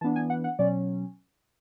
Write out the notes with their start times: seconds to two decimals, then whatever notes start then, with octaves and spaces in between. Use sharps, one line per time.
0.01 E3 B3 D4 A5
0.16 G#5
0.30 F#5
0.44 F#5
0.59 B2 F#3 C#4 D5